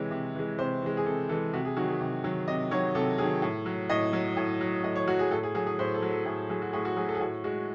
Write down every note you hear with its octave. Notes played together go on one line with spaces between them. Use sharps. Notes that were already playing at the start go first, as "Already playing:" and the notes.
Already playing: C3 E3 G#3 C#5
C3
E3 G#3
C3 C5
E3 G#3
G#4
C3 A4
E3 G#3 A4
C3 F#4
G#4
D#3 F#3 F#4
G#4
C3
D#3 F#3
C3 D#5
D#3 F#3 C#5
C3 A4
D#3 F#3 G#4
A2
F#3
A2 D#5
F#3
A2
F#3
A2 D#5
C#5
F#3 F#4
G#4
A2 A4
G#4
F#3 G#4
G#4
A2 C5
A4
F#3
A4
A2 G#4
F#3 G#4
F#4
A2 G#4
F#4
F#3 G#4
A4
G#4
A2 F#4
G#3 F#4